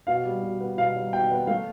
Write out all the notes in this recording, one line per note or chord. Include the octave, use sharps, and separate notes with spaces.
B2 F5
G3
B2
B3
B2 F5
G3
B2 G5
B3
A3 F5